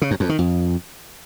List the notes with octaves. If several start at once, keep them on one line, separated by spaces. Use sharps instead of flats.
C#3
F#2
F2
D#3
F2